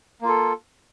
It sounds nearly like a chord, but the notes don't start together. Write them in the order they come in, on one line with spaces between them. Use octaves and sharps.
A#3 F4 A4